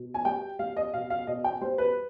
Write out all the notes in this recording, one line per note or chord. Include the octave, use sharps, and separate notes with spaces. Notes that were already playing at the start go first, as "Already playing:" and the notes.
Already playing: B2
G#5
G3 G5
G3 F5
D#5
B2 F5
F5
B2 D#5
G5
G3 C5
B4